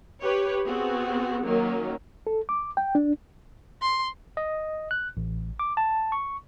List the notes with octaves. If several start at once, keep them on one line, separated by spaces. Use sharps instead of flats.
G4 B4 C#5
B3 C4 F#4 G#4
D#3 F#3 A#3 C#4
A4
D6
G5
D4
C6
D#5
F#6
A1
D6
A5
C#6